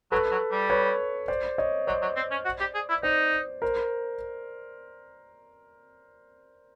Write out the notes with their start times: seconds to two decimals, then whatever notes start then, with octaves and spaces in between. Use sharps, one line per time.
0.12 F#3 A4 B4
0.31 F#3
0.51 G3
0.70 B4 C#5
1.28 C5 D5
1.58 C#5 D#5
1.87 F#3 C5 D5
2.02 F#3
2.16 C4
2.31 C#4
2.45 F#4
2.60 G4
2.75 G#4
2.89 E4
3.03 D#4 C5 D5
3.62 A#4 C5